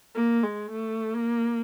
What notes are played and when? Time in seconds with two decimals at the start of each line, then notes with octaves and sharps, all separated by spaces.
0.15 A#3
0.44 G#3
0.72 A3
1.14 A#3